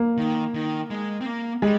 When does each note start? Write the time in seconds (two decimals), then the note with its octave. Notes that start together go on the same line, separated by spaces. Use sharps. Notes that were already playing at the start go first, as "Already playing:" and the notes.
Already playing: A#3
0.17 D#3
0.54 D#3
0.90 G#3
1.21 C4
1.26 A#3
1.62 G3 G#3